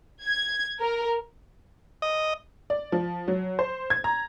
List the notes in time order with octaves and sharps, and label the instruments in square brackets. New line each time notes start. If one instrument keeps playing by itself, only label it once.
[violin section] G#6
A#4
[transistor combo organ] D#5
[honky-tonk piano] D5
F3
F#3
C5
G#6
A#5